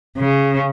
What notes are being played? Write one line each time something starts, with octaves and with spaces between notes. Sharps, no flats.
C#3